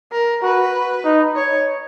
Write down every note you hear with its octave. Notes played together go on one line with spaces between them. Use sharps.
A#4
F#4 B4
D#4
C#5